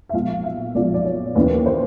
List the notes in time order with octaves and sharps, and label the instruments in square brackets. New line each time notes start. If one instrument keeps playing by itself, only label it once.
[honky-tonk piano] E5
B1 A#2 F3 G#3 F5
E5
B1 A#2 F3 G#3 D5
D5
C#5
D#2 C#3 E3 B4
C5